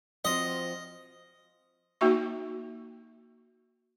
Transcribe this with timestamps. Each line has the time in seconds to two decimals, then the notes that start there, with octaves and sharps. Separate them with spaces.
0.25 F3 C4 F#4 D#5
2.01 A#3 D#4 F#4 E5 C#6